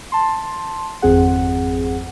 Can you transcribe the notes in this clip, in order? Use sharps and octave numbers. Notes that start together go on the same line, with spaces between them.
A5 C6
G#1 F2 C4 G#4 F#5